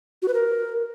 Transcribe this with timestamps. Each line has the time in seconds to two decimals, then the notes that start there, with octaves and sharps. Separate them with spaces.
0.22 F#4
0.28 B4
0.34 A#4